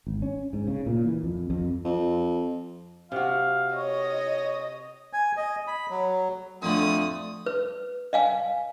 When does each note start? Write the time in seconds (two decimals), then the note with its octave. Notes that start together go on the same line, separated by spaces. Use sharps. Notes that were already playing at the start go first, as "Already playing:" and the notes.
0.07 G#1
0.22 C#4
0.53 G#2
0.68 C#3
0.86 A#2
1.05 E3
1.23 F2
1.50 F2
1.85 F2
3.12 C3 F#4 F5
3.75 C#5 D#5
5.13 G#5
5.37 D#5
5.67 B5
5.90 F#3
6.62 F2 D3 A3 D#6
7.46 B4
8.13 D#5 F5 G#5